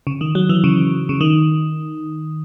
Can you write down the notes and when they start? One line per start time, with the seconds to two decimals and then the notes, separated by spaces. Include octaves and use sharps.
0.07 C#3
0.21 D#3
0.35 F#3
0.49 E3
0.64 C#3
1.09 C#3
1.21 D#3